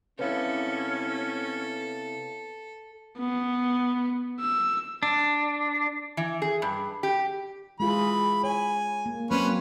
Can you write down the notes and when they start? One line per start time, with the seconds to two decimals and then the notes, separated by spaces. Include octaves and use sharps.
0.19 C3 B3 C#4 E4 A4 B4 C#5 F5
3.18 B3
4.41 E6
5.03 D4
6.17 E3
6.42 G#4
6.62 G2
7.03 G4
7.80 E3 G#3 F4 G#4 B5
8.44 C#5 G#5
9.06 A#3
9.31 F#3 A#3 C4 C#4 B4 C5